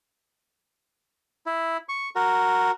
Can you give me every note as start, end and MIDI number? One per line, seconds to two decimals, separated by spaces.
1.46 1.77 64
1.89 2.10 85
2.16 2.71 66
2.16 2.71 70